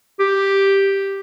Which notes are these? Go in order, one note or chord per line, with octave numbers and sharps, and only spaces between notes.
G4